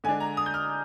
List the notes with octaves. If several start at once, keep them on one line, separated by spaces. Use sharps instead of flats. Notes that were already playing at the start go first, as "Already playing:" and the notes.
D3 G#3 D4 G#5
A#5
D#6
G6
F6